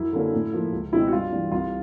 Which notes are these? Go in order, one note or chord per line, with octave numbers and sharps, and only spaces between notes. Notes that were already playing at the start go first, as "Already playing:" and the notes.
Already playing: F#2 E4
D3 F#3 A#3 C#4
A2
F3 A#3
C#2
B2 G#3 C4 E4
F#4
G2 F4
E3 G3
C2 F4